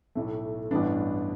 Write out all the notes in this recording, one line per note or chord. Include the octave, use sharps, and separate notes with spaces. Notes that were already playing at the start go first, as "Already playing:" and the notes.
B1 A2 A3
A1 G2 E3 B3 D4